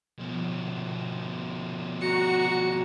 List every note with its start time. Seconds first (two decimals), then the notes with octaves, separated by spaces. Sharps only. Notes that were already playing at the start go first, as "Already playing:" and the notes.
0.18 B2 F3
2.01 F#4 A#5 C#7